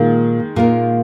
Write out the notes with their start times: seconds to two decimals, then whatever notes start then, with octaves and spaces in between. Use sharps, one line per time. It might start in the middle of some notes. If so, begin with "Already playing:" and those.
Already playing: A#2 D#3 G#3 A#3 F4
0.56 A#2 A#3 F4 A#4